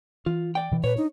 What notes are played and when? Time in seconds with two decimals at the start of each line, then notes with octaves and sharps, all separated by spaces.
0.26 E3 F4
0.55 D5 G5
0.71 B2 E3
0.84 A#2 B4 C#5
0.97 D4 D#4